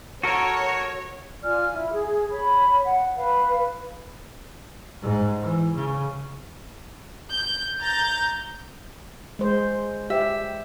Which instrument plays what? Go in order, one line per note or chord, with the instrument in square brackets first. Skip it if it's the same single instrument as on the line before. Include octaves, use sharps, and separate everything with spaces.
[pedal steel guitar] F#4 A4 A#4 [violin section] C#5
[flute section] F4 D5 G#5 F6
E4
G#4
C#5 B5
F#5
B4 F5
[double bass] G#2
E3
C#3
[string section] G6
A#5 G6 A6
[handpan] G#3 C5
[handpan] G4 [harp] E5